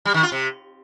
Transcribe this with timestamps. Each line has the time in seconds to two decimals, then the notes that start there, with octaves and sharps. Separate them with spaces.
0.05 G3
0.14 D#3
0.23 F4
0.32 C3